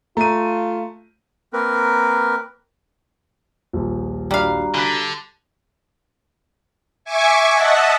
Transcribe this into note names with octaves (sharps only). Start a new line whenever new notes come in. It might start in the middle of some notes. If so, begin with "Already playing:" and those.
A3 F4 A#5 D#7
A#3 C4 A#4 B4
D#1 A#1
G3 D4 F#4 F5 A#5
D3 B5 F#6 B6
E5 G#5 C#6 D6
D#5 E5 F#5 A5